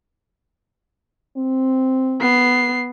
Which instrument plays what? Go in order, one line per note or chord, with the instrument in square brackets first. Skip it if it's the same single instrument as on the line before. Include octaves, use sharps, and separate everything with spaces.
[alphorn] C4
[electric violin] B3 C7